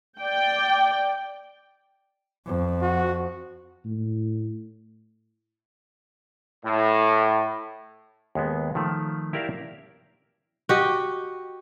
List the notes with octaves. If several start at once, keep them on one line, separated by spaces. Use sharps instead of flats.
D5 G5
F2
F#4
A2
A2
D#2 G#3 B3
D#3 F3 A3
E4 G4 A#4 D5 E5 F5
F#4 G4 D#5